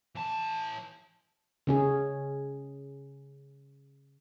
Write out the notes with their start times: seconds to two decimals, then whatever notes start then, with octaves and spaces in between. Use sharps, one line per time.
0.15 E3 A5
1.67 C#3 C#4 G#4